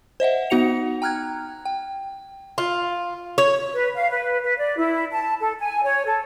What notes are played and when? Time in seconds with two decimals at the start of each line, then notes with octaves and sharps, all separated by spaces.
0.20 C5 D#5 E5 F#5
0.50 B3 D#4 F#4 F#5 C#7 F7
1.02 G5 A#5 F6 F#6 G#6
1.65 G5
2.58 F4
3.38 C#5
3.72 B4
3.95 F5
4.10 B4
4.43 B4
4.58 D5
4.78 E4
5.11 A5
5.40 A4
5.60 G#5
5.84 C#5
6.06 A4